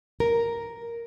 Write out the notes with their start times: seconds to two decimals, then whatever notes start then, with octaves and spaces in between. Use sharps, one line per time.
0.20 A#4